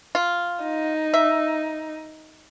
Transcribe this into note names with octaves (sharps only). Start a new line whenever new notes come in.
F4
D#4
E5